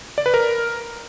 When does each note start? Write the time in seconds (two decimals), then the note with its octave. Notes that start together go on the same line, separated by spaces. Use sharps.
0.18 D5
0.26 B4
0.34 A#4